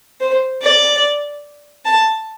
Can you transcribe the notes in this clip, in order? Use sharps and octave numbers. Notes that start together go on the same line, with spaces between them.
C5
D5
A5